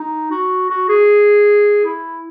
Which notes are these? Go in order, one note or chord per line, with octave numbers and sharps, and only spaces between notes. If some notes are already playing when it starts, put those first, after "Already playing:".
Already playing: D#4
F#4
F#4
G#4
E4